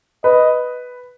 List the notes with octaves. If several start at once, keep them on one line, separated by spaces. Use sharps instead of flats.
B4 D#5